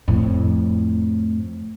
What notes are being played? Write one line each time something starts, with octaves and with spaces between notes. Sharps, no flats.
F2 A2